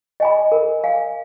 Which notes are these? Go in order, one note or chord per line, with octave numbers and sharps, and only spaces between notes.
D#5 G#5 B5
A#4
F5 G#5